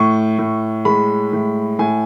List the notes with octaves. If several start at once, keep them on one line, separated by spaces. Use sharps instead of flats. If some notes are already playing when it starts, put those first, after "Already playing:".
Already playing: A2 C#6
A2
G#3 B5
A2
A2 G#5